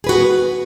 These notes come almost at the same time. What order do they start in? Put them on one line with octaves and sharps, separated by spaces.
G#4 B4 F#4 B3